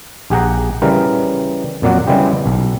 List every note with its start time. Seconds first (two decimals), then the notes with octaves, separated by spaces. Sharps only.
0.30 A#1 G4 G#4 F#5 G5 A#5
0.82 C#3 E3 G3 A#4
1.82 F2 A#2 F#3 D5 F#5
2.07 C#3 G3 G#3 B3 E4 G4
2.46 B1